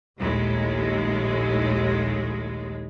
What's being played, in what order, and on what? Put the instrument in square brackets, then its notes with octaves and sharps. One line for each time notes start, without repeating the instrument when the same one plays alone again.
[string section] A#1 D#2 A2 G#3